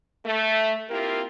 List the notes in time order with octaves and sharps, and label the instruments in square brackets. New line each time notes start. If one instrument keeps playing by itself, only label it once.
[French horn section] A3
A#3 C4 E4 F4 G4 A#4